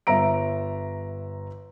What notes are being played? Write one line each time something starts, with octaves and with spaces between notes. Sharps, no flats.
G1 E5 A#5 D7